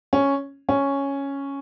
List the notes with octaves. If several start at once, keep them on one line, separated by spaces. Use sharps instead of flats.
C#4
C#4